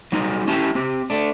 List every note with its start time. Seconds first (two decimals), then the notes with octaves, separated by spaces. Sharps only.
0.12 F#3 G3 D#4
0.47 C#4 E4 G4 A5
0.75 C4 G4
1.10 A3 D4